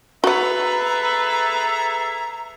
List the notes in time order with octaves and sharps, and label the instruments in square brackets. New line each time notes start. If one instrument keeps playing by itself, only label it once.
[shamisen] F#4 F#5 [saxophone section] G#4 A4 E5 [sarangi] B4 [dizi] A#5